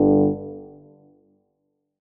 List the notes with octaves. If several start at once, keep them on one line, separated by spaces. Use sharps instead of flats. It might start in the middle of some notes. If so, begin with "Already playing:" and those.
Already playing: G1 G2 D3